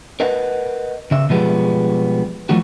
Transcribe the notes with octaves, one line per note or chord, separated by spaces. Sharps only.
A#4 B4 D#5 F#5
C#3 E5
B2 F3 G3 G#3 B3
E3 F3 A3 F#4